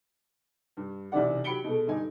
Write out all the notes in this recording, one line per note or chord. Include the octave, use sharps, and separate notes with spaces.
G2
B1 C3 E3 D4 D5 F#5
F#3 G4 B5 C#7 D7 G7
B2 G#3 A4
G2 D3 D#4 G#5